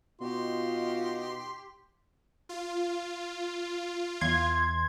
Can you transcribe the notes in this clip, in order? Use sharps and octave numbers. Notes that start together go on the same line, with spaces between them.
B2 D#4 F4 G4 C6
F4
E2 C6 G#6